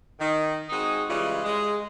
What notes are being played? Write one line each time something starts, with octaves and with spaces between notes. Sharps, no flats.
D#3
G#3 C4 D#4 F#4 G#4
C#3 E3 G3 G#3 F4
G#3